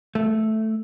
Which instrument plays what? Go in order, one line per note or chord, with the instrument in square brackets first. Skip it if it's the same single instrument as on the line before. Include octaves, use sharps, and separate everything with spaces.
[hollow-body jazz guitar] A3